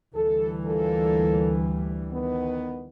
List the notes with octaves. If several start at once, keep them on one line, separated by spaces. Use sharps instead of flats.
D2 E3 G3 A4
A#2 A#3 A4
D#3 B3